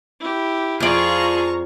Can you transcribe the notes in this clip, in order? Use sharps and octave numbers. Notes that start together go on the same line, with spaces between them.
E4 G4
F2 F4 G#4 D5 F5 A#5 C#6